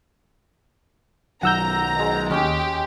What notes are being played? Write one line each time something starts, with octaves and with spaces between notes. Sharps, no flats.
B1 D#3 F#3 F#5 A#5 E6 G6
B2 G#3
D#2 C#4 G4 D#5 D6